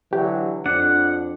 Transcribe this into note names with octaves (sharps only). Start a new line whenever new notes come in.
D3 E3 F#3 G4
F2 D4 F#5